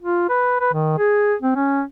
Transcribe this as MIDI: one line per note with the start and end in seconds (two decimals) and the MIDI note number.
0.01 0.26 65
0.29 0.60 71
0.60 0.72 71
0.73 0.95 51
0.98 1.34 68
1.42 1.55 60
1.55 1.83 61